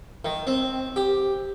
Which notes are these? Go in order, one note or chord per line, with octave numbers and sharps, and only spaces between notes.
D#3
C4
G4